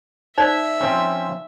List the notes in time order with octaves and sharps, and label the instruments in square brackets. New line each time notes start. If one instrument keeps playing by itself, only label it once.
[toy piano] D#4 C5 D5 [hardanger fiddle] E5
[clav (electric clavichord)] F3 C4 C#4